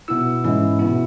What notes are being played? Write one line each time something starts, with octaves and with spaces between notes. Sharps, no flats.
B2 B3 E4 E6
G#2 E3 G#3 C#4 E4
B2 B3 E4